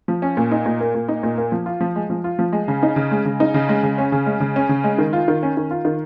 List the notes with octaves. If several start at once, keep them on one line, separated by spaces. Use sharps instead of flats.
F3
C#4
A#2
D#4
A#2
A#3
A#2
D#4
A#2
A#3
F3
F4
F3
G#3
F3
F4
F3
G#3
C#3
D#4
C#3
G#3
C#3
D#4
C#3
G#3
C#3
C#4
C#3
G#3
C#3
C#4
C#3
G#3
D#3
F4
D#3
C#4
D#3
F4
D#3